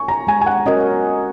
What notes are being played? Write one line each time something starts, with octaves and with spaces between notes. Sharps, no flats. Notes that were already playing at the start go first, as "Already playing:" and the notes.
Already playing: G#5 C#6
A#5
G#3 G#5
G#5
F#5
C#4 F#4 A#4 D#5